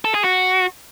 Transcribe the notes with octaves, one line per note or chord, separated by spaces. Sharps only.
A4
G#4
F#4